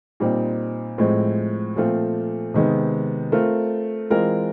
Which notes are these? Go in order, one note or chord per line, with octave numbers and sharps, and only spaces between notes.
A#2 G3 C4 D#4
A2 F3 G#3 C4
A#2 F3 A3 C4 F4
C3 D#3 G#3 B3
A3 C4 F4 A#4
E3 G#3 C4 F4 A#4